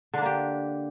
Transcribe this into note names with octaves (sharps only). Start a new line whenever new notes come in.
D3 A#3 D4 G4